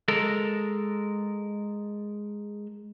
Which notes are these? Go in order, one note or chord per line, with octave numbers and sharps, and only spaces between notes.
G#3 A4 A#4